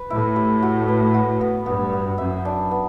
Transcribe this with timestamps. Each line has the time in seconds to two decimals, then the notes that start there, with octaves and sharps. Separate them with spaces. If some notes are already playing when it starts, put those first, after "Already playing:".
Already playing: B4
0.10 A2 E4
0.36 G4
0.63 F#4
0.88 B4
1.14 F#4
1.41 B3
1.66 G2 B3
1.93 B3
2.18 F#2 E5
2.45 D4
2.71 B3